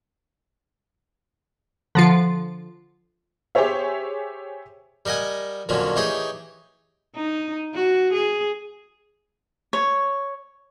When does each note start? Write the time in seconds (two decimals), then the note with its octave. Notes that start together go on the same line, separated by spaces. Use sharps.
1.95 D3 F3 F4
3.55 G4 G#4 C5 C#5 E5
5.06 G3 A#4 D#5 F#5 G#5
5.69 F2 A#2 D3 F#3 C#4
5.96 E3 D#4 G4 G#4 C#5
7.15 D#4
7.74 F#4
8.13 G#4
9.73 C#5